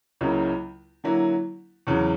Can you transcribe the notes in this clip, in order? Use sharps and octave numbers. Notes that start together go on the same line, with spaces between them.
C#2 C#3 F#3 A#3 E4
D3 F#3 A#3 E4
E2 C#3 F#3